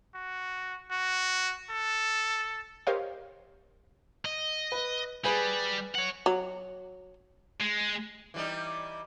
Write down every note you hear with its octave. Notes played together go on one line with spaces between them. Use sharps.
F#4
F#4
A4
G4 A#4 C5 C#5 D#5 F5
D#5
B4
G3 G#4 B4
C#5 F#5
F#3
G#3
E3 G3 D#4